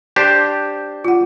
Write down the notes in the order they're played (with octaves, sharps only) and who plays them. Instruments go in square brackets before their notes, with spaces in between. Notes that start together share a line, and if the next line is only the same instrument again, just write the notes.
[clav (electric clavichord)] D4 G4 C5
[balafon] F4 F#5